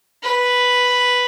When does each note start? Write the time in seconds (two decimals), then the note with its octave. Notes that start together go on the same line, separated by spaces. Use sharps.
0.23 B4